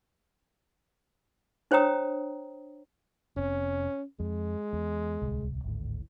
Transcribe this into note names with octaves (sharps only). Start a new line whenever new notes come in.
D4 C5 C#5 G5 A#5 D#6
F1 C4 C#4
F2 G#3
E2
D1 C2
G#1 D2 A2